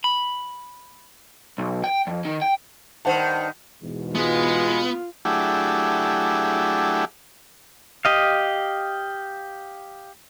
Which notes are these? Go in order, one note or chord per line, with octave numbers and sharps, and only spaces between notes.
B5
B1
G5
F2
D#3
G5
G2 D#3 C5 F#5 A5
E2 G#2 B2
G#3 B3 F4
F#3 A3 D4 E4 G4 G#4
G4 D#5 F5